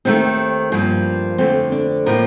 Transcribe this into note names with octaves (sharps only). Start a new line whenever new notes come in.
D#2 D#3 A3 C4
G2 F3 A#3
F2 D3 A3 C4
D4
A2 F3 A#3 A#4